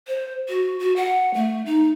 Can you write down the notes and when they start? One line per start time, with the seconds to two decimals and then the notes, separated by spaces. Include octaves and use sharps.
0.07 C5
0.49 F#4
0.80 F#4
0.96 F#5
1.34 A3
1.66 D#4